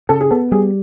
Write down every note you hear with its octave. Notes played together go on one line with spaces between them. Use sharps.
C#3 A4
G#4
B3 A4
G3 G#4